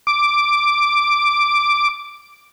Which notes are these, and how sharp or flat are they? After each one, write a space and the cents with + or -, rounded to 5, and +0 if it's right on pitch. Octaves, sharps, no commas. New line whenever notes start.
D6 +0